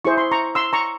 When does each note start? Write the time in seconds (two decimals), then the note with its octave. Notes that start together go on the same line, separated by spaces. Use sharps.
0.05 E4 G#4 C5 C#6
0.17 C6
0.32 A#5 C#6
0.55 C6 E6
0.73 A#5 C#6